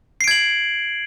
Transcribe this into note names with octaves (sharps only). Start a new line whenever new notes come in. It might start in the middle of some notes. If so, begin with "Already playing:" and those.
G#6 C7 D7 F#7